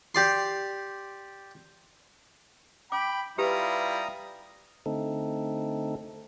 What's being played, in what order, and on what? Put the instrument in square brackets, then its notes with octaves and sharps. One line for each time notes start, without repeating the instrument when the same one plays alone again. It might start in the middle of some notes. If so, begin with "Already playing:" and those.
[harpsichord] G4 D5 C6
[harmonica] G5 B5 [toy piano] D6
[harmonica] G3 E4 F4 [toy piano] G4 B4 [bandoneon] A#5 D#6
[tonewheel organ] D3 A3 C4 D#4 A4